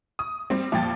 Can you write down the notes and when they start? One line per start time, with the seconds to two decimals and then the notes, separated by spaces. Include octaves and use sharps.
0.19 D#6
0.50 G3 C4
0.72 F2 A#2 G3 G4 G5 A6